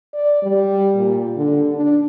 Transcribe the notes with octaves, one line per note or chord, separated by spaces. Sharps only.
D5
G3
A#2
D3
D4